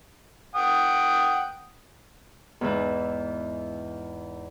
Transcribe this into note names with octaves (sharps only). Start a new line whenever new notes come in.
F#5 G5 D#6
E2 G#2 E3